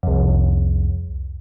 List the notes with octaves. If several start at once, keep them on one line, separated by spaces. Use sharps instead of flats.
C2 F2